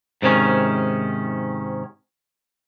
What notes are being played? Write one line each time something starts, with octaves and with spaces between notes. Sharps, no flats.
G#2 C3 D#3 C#4